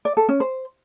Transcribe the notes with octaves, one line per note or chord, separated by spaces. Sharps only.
D5
A4
C#4
C5